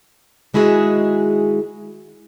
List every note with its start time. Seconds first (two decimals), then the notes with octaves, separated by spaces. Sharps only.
0.54 D#3 G#3 E4 F#4 G#4 E5